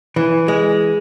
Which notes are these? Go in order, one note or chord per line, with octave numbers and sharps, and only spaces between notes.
E3
G#3